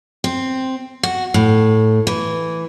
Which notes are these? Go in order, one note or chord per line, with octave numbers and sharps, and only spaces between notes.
C4
F#4
A2
E3